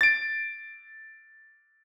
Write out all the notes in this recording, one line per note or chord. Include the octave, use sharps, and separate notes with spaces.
A6 D7